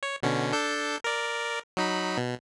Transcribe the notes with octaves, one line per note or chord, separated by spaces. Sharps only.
C#5
B2 D3 C#4
D4 A4 G6
A#4 D5
F#3 D#4 B5
B2